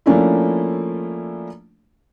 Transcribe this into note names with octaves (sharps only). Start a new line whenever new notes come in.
F3 A3 A#3 C#4 D4 E4